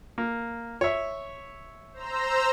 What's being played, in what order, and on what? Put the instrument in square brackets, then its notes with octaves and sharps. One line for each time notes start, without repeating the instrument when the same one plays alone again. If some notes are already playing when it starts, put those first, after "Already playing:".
[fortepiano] A#3
C#5 E5
[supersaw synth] C5 A#5 E6